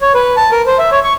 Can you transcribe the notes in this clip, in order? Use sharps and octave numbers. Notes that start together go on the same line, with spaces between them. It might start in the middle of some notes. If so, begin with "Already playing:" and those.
C#5
B4
A5
A#4
C5
E5
C#5
C#6